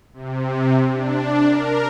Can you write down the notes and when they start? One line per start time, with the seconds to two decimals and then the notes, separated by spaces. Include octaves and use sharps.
0.14 C3
0.91 D4
1.48 A#4